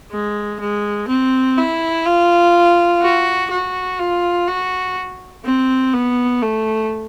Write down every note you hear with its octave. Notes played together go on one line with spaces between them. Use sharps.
G#3
G#3
C4
E4
F4
F#4
F#4
F4
F#4
C4
B3
A3